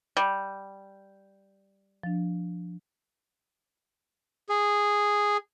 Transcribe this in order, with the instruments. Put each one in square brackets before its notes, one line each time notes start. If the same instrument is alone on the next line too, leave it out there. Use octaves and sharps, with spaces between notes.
[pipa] G3
[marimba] F3 D4
[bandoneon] G#4